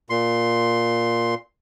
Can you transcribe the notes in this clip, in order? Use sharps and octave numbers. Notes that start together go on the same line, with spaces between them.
A#2 C6